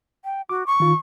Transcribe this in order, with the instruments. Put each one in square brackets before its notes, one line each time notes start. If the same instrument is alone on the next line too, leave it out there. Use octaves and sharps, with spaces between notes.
[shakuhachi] G5
[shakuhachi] F#4 [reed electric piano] D6
[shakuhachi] C#6
[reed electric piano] D#3 F4